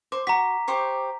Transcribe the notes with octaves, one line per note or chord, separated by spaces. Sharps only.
C5 D6
F#4 A#5 B6
G4 C5 C#6